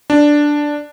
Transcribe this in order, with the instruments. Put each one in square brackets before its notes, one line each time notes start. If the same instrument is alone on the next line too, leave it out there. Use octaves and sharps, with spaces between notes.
[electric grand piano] D4